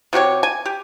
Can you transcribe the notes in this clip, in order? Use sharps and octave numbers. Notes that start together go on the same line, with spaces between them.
C3 F#4 G4 C#5
G#5
G4